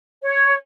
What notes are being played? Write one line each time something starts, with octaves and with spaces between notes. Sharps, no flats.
C#5